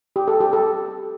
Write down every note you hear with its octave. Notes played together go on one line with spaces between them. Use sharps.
G4
A4
G4
A4